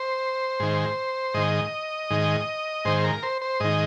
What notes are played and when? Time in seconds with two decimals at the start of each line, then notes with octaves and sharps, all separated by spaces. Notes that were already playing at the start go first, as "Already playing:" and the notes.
Already playing: C5
0.60 G#2 D#3
1.34 G#2 D#3 D#5
2.10 G#2 D#3
2.85 G#2 D#3 C5
3.04 A#4
3.23 C5
3.42 C5
3.60 G#2 D#3 D#5